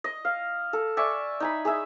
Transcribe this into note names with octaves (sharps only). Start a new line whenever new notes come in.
D#5
F5
A4
D5 E5 G#5 C#6
D#4 G#5 B5
G#4 D#5 E5